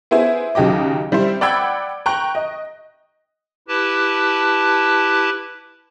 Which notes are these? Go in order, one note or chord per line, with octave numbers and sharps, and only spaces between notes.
B3 E4 G#4 C5 E5 G#5
D#2 C#3 F#3 G4 D#5 D6
G3 C4 E4 C5
D5 F#5 G5 B5 E6 G#6
G5 A#5 C#6 F#6
D#5
E4 G4 B4 A5